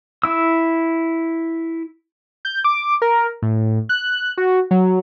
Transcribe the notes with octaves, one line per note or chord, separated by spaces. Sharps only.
E4 E6
G6
D6
A#4
A2
F#6
F#4
F#3